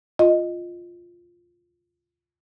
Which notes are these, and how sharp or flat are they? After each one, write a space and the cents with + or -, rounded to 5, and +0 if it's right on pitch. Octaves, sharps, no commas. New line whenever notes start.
F4 +0 D#5 -5